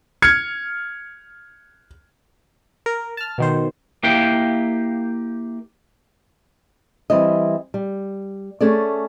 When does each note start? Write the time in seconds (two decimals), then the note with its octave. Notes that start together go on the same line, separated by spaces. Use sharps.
0.22 F6 G#6 C#7
2.86 A#4
3.17 A5 F6
3.38 B2 D#3 C5
4.03 A#3 E4 G4 F5 G5
7.10 E3 G3 C4 E4 D#5
7.74 G3
8.61 A3 C#4 G#4 A4 D5